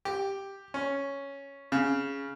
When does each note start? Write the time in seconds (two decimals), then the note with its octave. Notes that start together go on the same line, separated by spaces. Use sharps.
0.05 G4
0.74 C#4
1.72 C#3